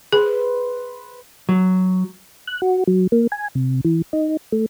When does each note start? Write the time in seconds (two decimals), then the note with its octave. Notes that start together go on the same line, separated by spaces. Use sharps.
0.13 G#4 B4 C5
1.49 F#3
2.48 F#6
2.62 F#4
2.87 F#3
3.12 A#3
3.32 G#5
3.55 C3
3.85 E3
4.13 D#4
4.52 A3